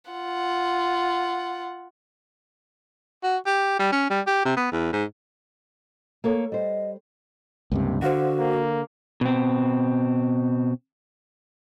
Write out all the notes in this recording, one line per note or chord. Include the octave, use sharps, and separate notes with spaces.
F4 F#5
F#4
G4
G3
C#4
G3
G4
C3
B3
E2
G#2
A#3 A4 C#5
G3 C5 D#5
C#2 G2 C3 A#3
D3 F#4 C5 F5 F#5
A#3
B2 C4